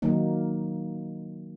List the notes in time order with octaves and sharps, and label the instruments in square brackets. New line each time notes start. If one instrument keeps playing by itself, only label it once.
[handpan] D#3 F#3 A#3 D#4